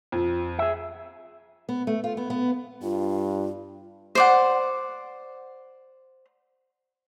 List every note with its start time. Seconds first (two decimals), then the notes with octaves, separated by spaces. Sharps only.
0.12 F2
0.59 G#4 E5
1.69 B3
1.87 A3
2.04 F4
2.17 B3
2.30 B3
2.82 G2 F4
4.15 C5 D5 F#5